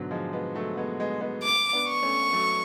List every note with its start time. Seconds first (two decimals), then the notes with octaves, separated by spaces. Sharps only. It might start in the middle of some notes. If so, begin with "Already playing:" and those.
Already playing: G#2 B2 D3 F#3
0.11 F3 G#3
0.33 G#3 B3
0.55 F#3 A3
0.77 G#3 B3
1.00 G#3 B3
1.21 G#3 B3
1.43 D6
1.73 B3 D4
1.88 C#6
2.02 A3 C#4
2.33 F#3 A3